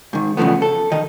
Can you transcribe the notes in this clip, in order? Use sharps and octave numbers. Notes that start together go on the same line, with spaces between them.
G#2 D#3
E2 C#3 F3 A3 B3
A4
D#3 D#5